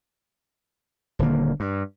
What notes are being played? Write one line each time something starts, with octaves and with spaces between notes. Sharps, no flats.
D#1 D3 A#3
G2